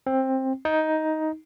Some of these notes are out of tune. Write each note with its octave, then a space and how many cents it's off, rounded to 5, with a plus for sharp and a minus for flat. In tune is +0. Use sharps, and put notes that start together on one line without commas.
C4 +15
D#4 +10